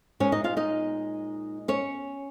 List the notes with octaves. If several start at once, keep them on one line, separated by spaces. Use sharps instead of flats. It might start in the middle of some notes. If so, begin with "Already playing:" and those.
A#2 G#3 C#4 D#4 C#5
D#4 D#5
F4 F5
D#4 D#5
C#4 C#5